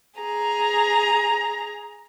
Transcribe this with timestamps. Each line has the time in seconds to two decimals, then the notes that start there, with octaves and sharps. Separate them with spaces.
0.20 G#4 A#5